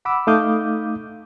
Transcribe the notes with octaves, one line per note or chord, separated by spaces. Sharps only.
F#5 B5 D6 E6
A3 D#4 F5 D6 D#6 G6